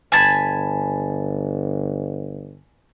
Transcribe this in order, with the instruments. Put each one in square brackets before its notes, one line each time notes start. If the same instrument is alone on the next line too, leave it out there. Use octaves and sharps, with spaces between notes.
[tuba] G1 [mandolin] G#5 A5 B5